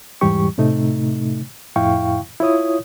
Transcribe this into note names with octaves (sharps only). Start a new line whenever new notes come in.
E2 G#2 E3 G3 G4 C#6
A2 C3 A3 D#4
F2 A2 E4 F5 G5 C#6
E4 F4 C#5 D#6